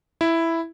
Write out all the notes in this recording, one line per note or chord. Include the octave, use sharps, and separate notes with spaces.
E4